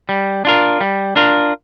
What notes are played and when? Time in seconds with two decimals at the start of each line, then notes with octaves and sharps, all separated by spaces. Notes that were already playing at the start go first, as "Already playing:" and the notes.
0.09 G3
0.45 D4 F4 A#4
0.81 G3
1.16 D4 F4 A#4